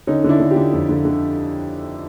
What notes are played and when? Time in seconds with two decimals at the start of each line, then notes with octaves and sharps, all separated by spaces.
0.07 D3 C#4 D#4
0.24 D3 D4 E4
0.40 D3
0.51 F4 G4
0.56 D3
0.73 F2
0.89 D3
1.05 D3